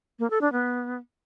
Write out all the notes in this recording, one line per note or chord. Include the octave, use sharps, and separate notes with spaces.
A#3
A4
D4
B3